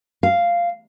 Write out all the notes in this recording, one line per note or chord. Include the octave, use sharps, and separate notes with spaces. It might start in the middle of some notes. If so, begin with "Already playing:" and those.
F5